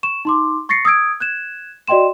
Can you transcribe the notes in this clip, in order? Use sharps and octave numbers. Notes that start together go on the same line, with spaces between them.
C#6 E7
D#4 C6 D6
C#6 A6 A#6 C7 C#7
D#6 E6 G#6 D7
F#6 G#6 E7
F#4 D5 D#5 G5 C6 E7